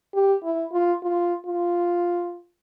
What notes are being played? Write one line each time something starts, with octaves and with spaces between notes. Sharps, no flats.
G4
E4
F4
F4
F4